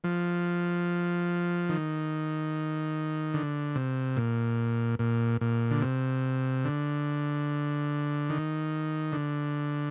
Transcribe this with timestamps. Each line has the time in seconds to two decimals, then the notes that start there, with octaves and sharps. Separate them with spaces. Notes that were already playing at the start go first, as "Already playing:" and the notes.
0.04 F3
1.69 D#3
3.34 D3
3.76 C3
4.17 A#2
4.99 A#2
5.41 A#2
5.71 D3
5.82 C3
6.65 D3
8.30 D#3
9.12 D3